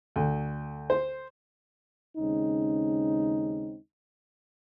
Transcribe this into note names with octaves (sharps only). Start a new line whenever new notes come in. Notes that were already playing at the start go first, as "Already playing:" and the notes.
D2
C5
D#2 C#3 G#3 C4 C#4 D#4